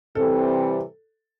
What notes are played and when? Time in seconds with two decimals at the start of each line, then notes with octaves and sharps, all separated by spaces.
0.15 C3 E3 G3 C4 A4